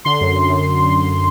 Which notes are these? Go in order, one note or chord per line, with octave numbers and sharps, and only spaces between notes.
D3 C6
F#2
F#2
F#2